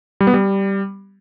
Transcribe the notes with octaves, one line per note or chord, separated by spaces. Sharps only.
G3
B3
G3